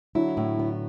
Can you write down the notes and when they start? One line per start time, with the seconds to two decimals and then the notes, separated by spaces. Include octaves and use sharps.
0.15 D3 F#3 E4
0.37 A2
0.58 D3 F#3 B3